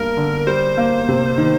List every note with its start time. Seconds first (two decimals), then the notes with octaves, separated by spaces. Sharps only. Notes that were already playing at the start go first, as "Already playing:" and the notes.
Already playing: G2 A#3 A#4
0.17 D3
0.47 G3 C5
0.77 A#3
1.08 C3
1.38 D#3